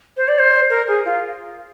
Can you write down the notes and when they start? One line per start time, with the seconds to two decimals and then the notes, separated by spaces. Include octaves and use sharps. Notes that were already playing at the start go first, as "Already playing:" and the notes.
0.17 C5
0.28 D5
0.38 C5
0.70 A#4
0.87 G#4
1.05 F4